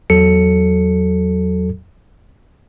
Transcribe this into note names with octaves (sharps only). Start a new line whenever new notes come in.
E2 F#3 A4 C#7